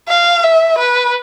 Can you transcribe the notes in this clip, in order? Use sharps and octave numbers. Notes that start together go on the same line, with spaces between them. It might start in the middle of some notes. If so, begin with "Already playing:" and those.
F5
E5
B4